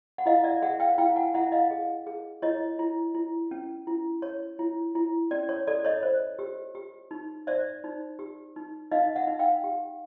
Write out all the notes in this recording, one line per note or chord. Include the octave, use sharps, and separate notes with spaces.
F#5
E4 D#5 F5
D5 E5
G#4 E5 F#5
F5 G5
E4 F5 G5
F#5 G#5
E4 E5 F#5
D#5 F5
G#4
G#4
E4 C#5 D#5
E4
E4
C#4
E4
C#5
E4
E4
C#4 D5
C#5
A4 D5
C#5 D#5
C5
G4
G4
D#4
C5 D5 E5
D#4
G4
D#4
D#4 D#5 F5
E5 F#5
D#4
F5 G5
G4